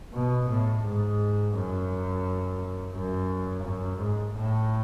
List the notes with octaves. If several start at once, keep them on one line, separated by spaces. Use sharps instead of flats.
B2
A2
G#2
F#2
F#2
F#2
G#2
A2